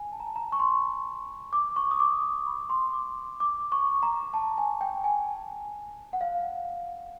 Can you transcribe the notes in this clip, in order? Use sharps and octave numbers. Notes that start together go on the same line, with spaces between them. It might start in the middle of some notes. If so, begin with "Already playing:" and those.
Already playing: G#5
A5
A#5
A5
A#5
C#6
C6
D6
C#6
D#6
D6
C#6
B5
C6
D6
D6
C#6
A#5
A5
G#5
G5
G#5
A5
F#5
F5